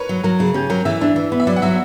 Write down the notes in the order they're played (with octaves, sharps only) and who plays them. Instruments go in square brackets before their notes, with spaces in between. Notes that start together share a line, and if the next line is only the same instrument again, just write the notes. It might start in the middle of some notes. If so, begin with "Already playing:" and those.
Already playing: [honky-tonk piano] A#4 B4 C#5
[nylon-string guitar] F#3
[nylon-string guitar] F#3 [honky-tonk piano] A#4
[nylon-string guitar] C#3
[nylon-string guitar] C#4 [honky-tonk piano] G4
[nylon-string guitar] F#3 [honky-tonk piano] A#4
[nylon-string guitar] E3 [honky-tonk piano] E5
[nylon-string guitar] D4
E3
B3
[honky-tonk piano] E5
[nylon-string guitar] F#3 [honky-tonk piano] D5
[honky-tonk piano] F#5
[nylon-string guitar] F#3 [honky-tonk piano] E5